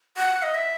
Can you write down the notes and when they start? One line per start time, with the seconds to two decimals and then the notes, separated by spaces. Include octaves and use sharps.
0.17 F#5
0.43 D#5
0.54 E5